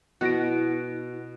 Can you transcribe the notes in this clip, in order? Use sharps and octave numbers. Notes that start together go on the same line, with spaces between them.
B2 B3 E4 F#4 F#6 A#6 D7